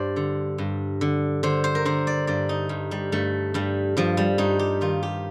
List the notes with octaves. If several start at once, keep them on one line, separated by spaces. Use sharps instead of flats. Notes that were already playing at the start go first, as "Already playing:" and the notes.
Already playing: G2 C5 D5
D3
G2
D3
D3 C5
C5
A#4
D3 C5
D5
G2 D5
D#4
G2
G3
G2 A3
G2 G3
G2 F3
G3
G2 D#4
G4
D#3 F4
G4